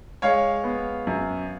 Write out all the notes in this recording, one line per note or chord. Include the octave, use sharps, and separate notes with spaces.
G#3 C#5 F5
B3
F#2